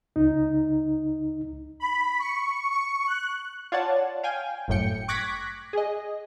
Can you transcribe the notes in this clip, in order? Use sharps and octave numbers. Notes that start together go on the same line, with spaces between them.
C#2 D#4
B5
C#6
C#6
F#6
F4 C#5 D5 F#5 A5
F5 G5 G#5
G1 F#2 A2 G5 C#7
C#6 D6 F#6 G#6 A#6 B6
G#4 D#5